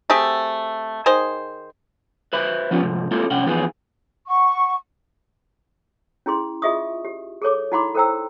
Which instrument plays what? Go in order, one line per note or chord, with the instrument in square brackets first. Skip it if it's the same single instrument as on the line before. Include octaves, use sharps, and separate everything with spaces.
[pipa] A3 C4 G4 G#4
D#3 G#4 C5
[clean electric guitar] B4 C5 E5 B5
F3 G3 B3 C#4 F4
G#2 C3 F3
G#3 A#3 C4 E4 F4 A4
C2 C3 C#4 F#5 G5
F2 E3 B3 D#4 F4 G#4
[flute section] F#5 C#6
[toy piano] C#4 E4 G#4 C6
F4 G#4 D#5 E5 C#6 D#6
G4
G#4 A4 C#5 D6
D#4 E4 F#5 B5 C6 D6
A4 A#4 C5 G5 A#5 E6